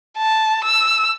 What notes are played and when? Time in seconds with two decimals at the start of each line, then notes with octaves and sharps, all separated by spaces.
0.18 A5
0.64 E6